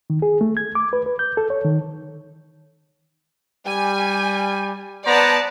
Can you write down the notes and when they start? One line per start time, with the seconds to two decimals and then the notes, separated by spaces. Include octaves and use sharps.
0.10 D#3
0.22 G#4
0.41 A3
0.57 G#6
0.75 D6
0.93 B4
1.06 B4
1.19 G6
1.37 A4
1.50 C#5
1.64 D#3
3.67 G3 G#5
5.07 B3 C5 D5 A5 A#5